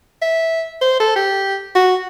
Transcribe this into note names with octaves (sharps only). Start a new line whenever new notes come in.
E5
C5
A4
G4
F#4